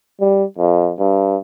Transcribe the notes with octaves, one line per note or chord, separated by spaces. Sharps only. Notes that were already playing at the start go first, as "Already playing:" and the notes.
G3
F2
G2